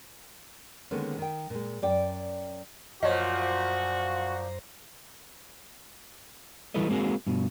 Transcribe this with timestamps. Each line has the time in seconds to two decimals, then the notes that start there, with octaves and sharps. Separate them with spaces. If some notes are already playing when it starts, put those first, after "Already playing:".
0.91 D3 D#3 G#3 A#3 B3 C#4
1.18 D#3 G5
1.50 A#2 G#3
1.82 F#2 D5 G5
3.03 F#2 A#2 F3 F#4 C5 C#5 D#5 A#5
6.74 E3 G3 E4 A4 B4 D#5
6.89 G#3 A#3 C4 F#4 G#4
7.27 G2 B2